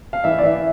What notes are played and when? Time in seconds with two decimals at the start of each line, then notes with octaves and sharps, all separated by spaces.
0.13 F5
0.24 E3 E5
0.38 D5
0.43 E3 E5